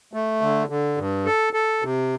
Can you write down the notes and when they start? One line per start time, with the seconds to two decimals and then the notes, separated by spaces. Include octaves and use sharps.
0.13 A3
0.41 D3
0.69 D3
0.98 G2
1.25 A4
1.53 A4
1.82 C3